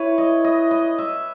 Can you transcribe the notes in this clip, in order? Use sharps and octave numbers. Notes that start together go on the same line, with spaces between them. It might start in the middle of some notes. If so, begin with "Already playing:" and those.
Already playing: E4 B4 C#5
D#5
D#5
D#5
E5